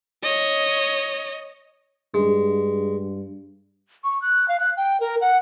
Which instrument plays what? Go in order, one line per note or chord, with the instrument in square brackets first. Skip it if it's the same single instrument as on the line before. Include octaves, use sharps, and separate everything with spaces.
[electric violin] C#5 D#5
[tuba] G2 [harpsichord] G#3
[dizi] C#6
F#6
F5
F#6
G5
A#4
F#5